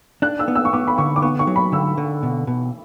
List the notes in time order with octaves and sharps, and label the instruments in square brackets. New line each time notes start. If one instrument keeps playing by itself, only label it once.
[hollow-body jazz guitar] D4 [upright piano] F#6
[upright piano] E6
[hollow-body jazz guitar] B3
[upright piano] E6
C#6
[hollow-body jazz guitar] B3 [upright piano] D6
[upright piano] B5
[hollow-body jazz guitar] D3 [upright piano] C#6
[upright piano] D6
[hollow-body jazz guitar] B3 [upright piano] C#6
[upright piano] C#6
[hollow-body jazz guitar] F#3
[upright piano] B5
[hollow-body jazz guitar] D3 [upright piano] E6
[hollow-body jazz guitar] D3
B2
B2